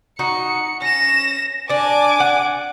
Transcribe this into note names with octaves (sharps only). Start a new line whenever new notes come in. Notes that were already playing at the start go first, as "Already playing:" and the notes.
D#4 F#4 C#7
C#4 A#6 E7
D4 D5 G#5 D6
F#5